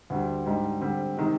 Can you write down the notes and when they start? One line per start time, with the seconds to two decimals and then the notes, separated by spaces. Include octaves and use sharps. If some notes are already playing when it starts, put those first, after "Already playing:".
0.10 D2 D3 G3
0.46 G#2 G3 D4
0.81 D3 G3 C4
1.17 C3 D#3 G#3